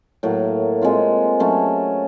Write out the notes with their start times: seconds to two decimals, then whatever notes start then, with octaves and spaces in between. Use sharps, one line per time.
0.23 A2 F#3 A#3
0.81 G#3 C4 F4
1.40 F#3 A3 C#4